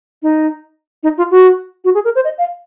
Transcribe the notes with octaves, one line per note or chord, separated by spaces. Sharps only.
D#4
D#4
F4
F#4
F#4
G#4
A#4
C5
D#5
F5